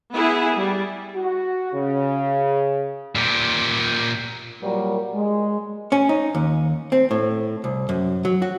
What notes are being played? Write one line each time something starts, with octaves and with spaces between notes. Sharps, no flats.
B3 E4 G#4
G3
F#4
C#3
A#2 G4
A#2 F#3 G3 A#4
G#3
C#4
D#4
D#2
C4
A2
C2
F#2
F#3
F#4